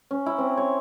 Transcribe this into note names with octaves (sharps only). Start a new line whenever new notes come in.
C#4
E4
C4
C#5